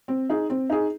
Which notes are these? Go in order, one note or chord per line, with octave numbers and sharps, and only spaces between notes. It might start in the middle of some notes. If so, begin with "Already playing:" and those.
C4
D#4 G#4
C4
D#4 G#4